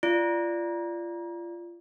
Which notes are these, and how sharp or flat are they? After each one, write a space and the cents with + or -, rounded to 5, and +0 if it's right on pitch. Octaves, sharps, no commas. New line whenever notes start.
F4 -25 D5 +0